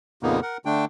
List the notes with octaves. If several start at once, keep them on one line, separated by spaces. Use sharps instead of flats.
F2 A#2 C#3 A#3 B3 D#4
A#4 F#5
D3 A3 D4 G5